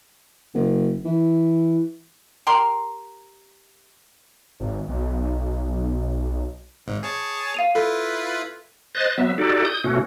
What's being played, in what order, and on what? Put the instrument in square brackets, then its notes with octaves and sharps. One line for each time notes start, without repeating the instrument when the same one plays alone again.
[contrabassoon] F#1
E3
[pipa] G4 A#4 C6
[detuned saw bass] G#1
B1
B1
[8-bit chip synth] G#1 G#2
G#4 C#5 A5
[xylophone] F5 D#7 F7
[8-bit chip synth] E4 F4 B4 [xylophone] A4
[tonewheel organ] C5 D#5 F#6 A6
F#3 B3 E5
D#4 F#4 G4 A4 D5
D#6 G6
B2 A3 C#4 F#4